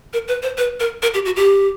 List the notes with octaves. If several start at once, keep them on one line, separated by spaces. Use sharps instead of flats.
A#4
B4
C5
B4
A#4
A#4
G4
F#4
G4